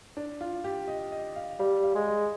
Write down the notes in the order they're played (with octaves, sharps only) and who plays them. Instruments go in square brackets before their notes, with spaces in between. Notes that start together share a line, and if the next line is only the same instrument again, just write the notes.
[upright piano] D4
F4
G4
D#5
D#5
F5
[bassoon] G3 [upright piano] F5
[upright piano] F5
[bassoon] G#3
[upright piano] D#5